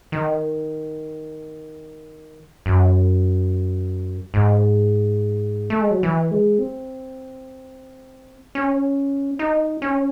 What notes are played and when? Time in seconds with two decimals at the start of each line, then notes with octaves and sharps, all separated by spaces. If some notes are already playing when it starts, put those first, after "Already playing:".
0.12 D#3
2.66 F#2
4.34 G#2
5.70 A3
5.81 G#3
5.91 F#3
6.03 E3
6.31 G#3
6.59 C4
8.55 C#4
9.39 D#4
9.82 C#4